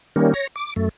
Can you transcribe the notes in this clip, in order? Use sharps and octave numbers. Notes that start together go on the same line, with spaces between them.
D#3 G3 A#3 C#4
C#5 A#6
D6
F#2 A3